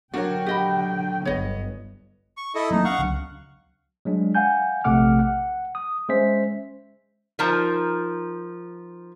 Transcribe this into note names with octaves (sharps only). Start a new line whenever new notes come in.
D3 F#3 D4 F#4 A#4 C#5 F#5 G5
G4 D#5 B5
G1 B3 C#5 D#5
C#6
E4 A4 D#5
F#3 A#3 C4 D#4
C#4 F5 F#5 C#6
C#2 F#3 D4
F#3 G#3 D4
F5 F#5 G#5 G6
A#1 C3 A3 F#5 D6 F6
F#5
D#6
G#3 C#4 C5 E5 B6
F3 D#4 F4 A#4 A5